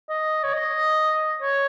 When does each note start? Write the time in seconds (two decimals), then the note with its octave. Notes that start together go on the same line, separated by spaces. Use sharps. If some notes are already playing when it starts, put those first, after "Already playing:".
0.10 D#5
0.44 C#5
0.53 D#5
1.42 C#5